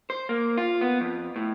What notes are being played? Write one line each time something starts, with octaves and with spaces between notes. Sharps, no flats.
C5
A#3
F4
B3
F2
A2